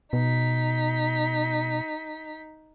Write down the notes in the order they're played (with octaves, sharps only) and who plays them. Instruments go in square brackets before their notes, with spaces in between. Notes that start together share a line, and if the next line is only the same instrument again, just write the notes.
[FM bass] B2 [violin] D#4 B6